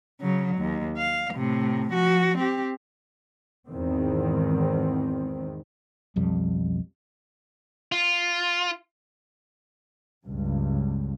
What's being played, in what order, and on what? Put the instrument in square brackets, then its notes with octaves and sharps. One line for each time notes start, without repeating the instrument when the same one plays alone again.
[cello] C#3 F#3
D#2
F5
A2 C3
F3 F#4
C4 G4
[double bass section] E2 G#2 D#3 C4
[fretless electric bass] B1 F2 G3
[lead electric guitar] F4
[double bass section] C#2 G2